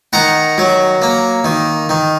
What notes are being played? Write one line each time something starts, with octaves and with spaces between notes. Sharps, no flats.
D#3 F#5 A#5
F#3
A#3
D#3
D#3